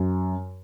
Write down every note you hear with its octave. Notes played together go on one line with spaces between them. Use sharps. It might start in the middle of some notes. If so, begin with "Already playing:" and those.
Already playing: F#2